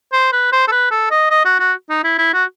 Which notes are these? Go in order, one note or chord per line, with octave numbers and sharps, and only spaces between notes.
C5
B4
C5
A4
B4
A4
D#5
D#5
F#4
F#4
D#4
E4
E4
F#4